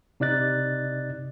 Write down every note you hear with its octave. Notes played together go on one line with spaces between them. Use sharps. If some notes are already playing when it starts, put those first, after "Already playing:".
C3 D#4 D5 D#5 F#6 A6